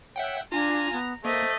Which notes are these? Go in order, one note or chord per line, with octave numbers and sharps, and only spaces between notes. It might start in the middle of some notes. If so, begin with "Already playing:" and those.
C#5 E5 F#5 G5
D4 F4 G#5 A#5
B3
A3 A#3 C5 D#5